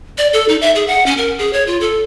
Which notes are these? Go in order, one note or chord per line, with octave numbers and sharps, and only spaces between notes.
D5
A4
D#4
E5
G#4
F#5
C#4
A#4
G#4
C#5
F4
A4